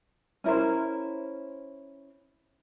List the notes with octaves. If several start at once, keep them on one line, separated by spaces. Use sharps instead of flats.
C#4 E4 A#4 C5